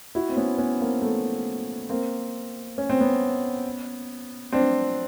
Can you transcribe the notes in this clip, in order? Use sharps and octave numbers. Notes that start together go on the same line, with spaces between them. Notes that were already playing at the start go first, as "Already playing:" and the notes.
E4 F#4
C4
B3 C#4
B3 C#4
A#3 C4
A3 B3
A#3 C4
C#4
C4
B3 C#4
C4 D4